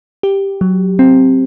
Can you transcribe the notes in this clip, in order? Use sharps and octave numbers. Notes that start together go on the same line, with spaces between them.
G4
F#3
C4